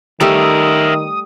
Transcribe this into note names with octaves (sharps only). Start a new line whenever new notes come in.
D#3 G3 A3 G4 A#4 E5 D#6